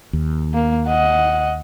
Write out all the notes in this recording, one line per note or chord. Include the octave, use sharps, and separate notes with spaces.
D#2
A#3
D#5 F#5